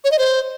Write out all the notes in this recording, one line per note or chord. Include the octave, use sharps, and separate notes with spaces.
C#5
D#5
C5